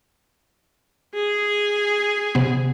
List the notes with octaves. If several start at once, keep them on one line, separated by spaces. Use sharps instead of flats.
G#4
C3 B3